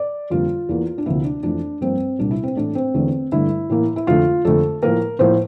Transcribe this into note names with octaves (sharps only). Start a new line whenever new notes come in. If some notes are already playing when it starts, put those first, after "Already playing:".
Already playing: D5
F2 D3 G3 A#3 F4
E2 E3 A#3
D4
D2 C3 F3 A#3 E4
D4
F2 E3 A3 D4
G2 F3 A#3 C4
C2 A#2 G3 D4
E4
C4
A2 E3 A3 D4
C4
E2 D3 A3
G2 D3 A3 E4
A2 E3 A#3
E4
F2 D3 A3 F4
F2 D3 A3 A4
A2 F3 A#3 A#4
A2 F3 A#3 C5